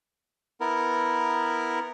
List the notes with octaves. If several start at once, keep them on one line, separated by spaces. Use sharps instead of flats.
B3 E4 A#4